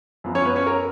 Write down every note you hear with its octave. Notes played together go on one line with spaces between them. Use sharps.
F#2 F3 B3
C#4 C#5
B3 B4
C#4 C#5
A#4